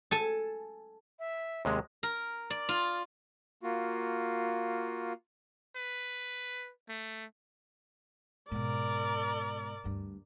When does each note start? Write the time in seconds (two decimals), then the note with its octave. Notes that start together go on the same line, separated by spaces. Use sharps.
0.11 A4 G#5 A5
1.19 E5
1.65 D#2 C3 G#3
2.03 A#4
2.50 D5
2.69 F4
3.63 A#3 F4 F#4
5.76 B4
6.89 A3
8.51 G#2 B2 A#4 D5
9.84 D2 G2